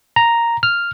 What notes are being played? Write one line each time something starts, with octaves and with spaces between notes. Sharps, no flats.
A#5
F6